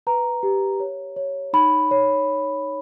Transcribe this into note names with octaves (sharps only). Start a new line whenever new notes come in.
B4 A#5
G4
C#5
C#5
D#4 B5
C#5